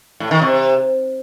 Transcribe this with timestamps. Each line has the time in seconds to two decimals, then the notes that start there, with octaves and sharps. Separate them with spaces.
0.20 A2
0.31 D#3
0.42 C3